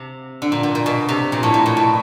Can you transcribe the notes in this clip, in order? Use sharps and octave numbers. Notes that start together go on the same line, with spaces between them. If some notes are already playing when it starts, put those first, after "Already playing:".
Already playing: C3
D3
A#2
A#2
A#2
B2
C3
A#2
A2
A#2
A2
B2